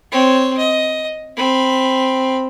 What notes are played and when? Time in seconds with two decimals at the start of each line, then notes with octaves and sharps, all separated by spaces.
0.12 C4 C#5
0.57 D#5
1.36 C4 B5